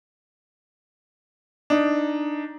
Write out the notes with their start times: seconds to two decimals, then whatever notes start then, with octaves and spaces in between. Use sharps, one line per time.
1.70 D4 D#4